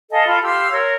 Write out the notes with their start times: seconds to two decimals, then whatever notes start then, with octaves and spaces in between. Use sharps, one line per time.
0.11 A4 D#5 F5 G#5
0.27 F4 A4 B5
0.43 G4 F5 C6 E6
0.71 A#4 C#5